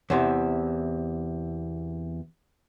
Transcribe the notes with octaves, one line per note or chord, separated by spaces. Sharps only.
E2 C3 E4